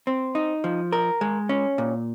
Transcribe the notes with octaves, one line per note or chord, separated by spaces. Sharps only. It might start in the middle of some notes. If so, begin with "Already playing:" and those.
C4
D#4
F3
A#4
G#3
C#4
A#2